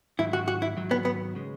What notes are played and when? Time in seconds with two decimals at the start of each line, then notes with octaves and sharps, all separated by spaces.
0.19 G#2 D#3 F#3 E4
0.33 F#4
0.48 F#4
0.62 E4
0.77 G#2 D#3 F#3
0.91 B3
1.05 B3
1.35 C#3 G#3